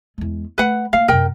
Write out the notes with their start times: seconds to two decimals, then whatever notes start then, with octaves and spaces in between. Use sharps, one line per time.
0.18 E2 G#3
0.58 A3 B4 F#5
0.93 A#3 F5
1.08 F#2 C3 A#4 G5